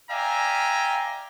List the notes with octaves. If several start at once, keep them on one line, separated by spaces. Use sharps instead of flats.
D5 E5 F5 G5 G#5 A#5